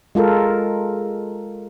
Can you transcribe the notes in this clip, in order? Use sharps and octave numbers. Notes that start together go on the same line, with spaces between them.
G#3 F4 A4 A#4